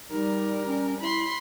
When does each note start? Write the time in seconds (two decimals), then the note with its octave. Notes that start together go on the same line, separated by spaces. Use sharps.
0.10 G3 D#4 A#4
0.66 C#4
1.01 E4 B5 C6